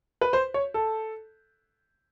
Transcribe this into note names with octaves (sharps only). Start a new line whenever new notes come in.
B4
C5
C#5
A4